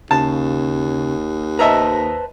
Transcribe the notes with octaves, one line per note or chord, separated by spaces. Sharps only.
D#2 C#3 A5
B4 C5 D#5 E5 A5 A#5